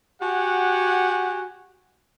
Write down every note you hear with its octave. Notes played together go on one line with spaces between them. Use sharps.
F#4 G4 F#5 G#5